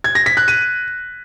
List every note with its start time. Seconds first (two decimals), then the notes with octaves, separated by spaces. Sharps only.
0.04 G#6
0.15 A#6
0.26 B6
0.37 F#6
0.48 D#7